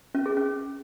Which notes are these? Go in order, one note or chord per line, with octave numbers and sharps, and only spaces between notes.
C#4
G#4
C#4